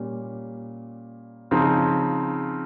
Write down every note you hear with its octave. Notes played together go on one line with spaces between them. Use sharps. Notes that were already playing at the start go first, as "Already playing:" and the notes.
Already playing: A#2 G3 C#4
C#3 F3 C4 D#4